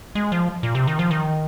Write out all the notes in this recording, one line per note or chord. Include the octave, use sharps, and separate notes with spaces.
G#3
F3
A#2
C3
D#3
F3
D#3